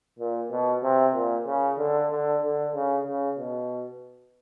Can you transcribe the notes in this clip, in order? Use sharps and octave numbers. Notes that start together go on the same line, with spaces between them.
A#2
B2
C3
A#2
C#3
D3
D3
D3
C#3
C#3
B2